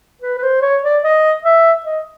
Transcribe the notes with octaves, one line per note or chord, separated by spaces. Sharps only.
B4
B4
C5
C#5
D5
D#5
E5
D#5